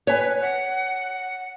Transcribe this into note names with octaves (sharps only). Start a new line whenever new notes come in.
B4 C#5 G#5
F#5